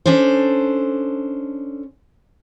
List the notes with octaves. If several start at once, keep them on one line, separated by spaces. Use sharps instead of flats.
C#4 D4 A4 C5